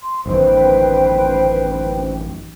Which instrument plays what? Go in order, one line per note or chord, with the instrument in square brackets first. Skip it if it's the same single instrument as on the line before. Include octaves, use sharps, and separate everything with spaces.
[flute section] C6
[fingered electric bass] A1 F#2 D#3 [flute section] B4 C5 G5